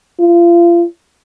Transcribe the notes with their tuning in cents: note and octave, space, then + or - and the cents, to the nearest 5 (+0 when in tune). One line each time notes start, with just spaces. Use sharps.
F4 -30